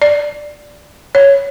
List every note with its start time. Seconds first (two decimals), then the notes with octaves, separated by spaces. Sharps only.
0.02 D5
1.15 C#5